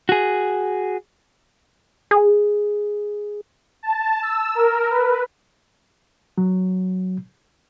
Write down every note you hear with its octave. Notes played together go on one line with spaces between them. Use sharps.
F#4 G#4
G#4
A5
E6
A#4
B4
F#3